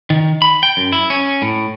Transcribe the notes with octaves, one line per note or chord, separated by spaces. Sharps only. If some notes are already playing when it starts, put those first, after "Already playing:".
D#3
B5
G5
F#2
E4
C#4
A2